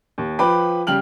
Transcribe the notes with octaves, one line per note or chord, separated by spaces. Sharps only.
D#2
F3 B4 G5 B5 D6
C#3 G3 G5 F6 F#7